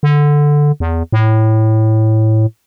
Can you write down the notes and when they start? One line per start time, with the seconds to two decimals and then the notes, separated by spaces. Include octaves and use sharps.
0.03 D3
0.80 E2
1.12 A2